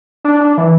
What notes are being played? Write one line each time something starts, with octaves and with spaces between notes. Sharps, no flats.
D4
D4
E3